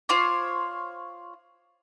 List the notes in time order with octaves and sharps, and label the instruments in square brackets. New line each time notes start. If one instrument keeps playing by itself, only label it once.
[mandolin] F4 C5 C#5 D6